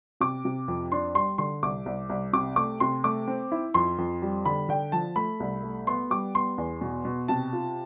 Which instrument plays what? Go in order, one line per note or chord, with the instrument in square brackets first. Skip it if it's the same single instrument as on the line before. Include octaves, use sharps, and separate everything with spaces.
[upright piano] C3 D6
C3
F2
D4 C6
G3 C6
D3 C6
C2 D6
C2
C2
C3 D6
A3 D6
C3 C6
A3 D6
C4
E4
F2 C6
F2
G3
D3 B5
D3 G5
F3 A5
A3 B5
C2
A3
B3 C6
G3 D6
B3 C6
E2
B2
B2
C3 A5
F4